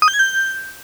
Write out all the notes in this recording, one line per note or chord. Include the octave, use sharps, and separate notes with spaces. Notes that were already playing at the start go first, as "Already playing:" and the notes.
D#6
G6
G#6
G6